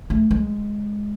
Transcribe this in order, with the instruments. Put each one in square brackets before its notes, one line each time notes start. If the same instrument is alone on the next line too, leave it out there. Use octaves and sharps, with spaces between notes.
[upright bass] A3
G#3